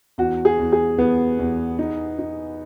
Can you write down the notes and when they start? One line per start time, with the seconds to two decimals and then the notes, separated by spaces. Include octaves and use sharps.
0.18 E2 F#4
0.45 G#4
0.59 E2
0.72 G#4
0.98 E2 B3
1.39 E2
1.79 D#4
2.19 D#4